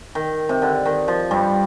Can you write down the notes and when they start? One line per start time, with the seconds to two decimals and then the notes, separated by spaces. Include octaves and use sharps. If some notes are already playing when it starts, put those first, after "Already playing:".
0.15 D#3
0.49 C3
0.62 D3
0.86 D#3
1.08 F3
1.31 G2 G3